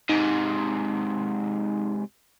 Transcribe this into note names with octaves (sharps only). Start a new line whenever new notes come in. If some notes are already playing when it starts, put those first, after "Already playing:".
G#2 C3 D#4